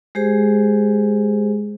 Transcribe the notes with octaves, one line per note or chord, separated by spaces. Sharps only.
G#3 G4 G#4 C5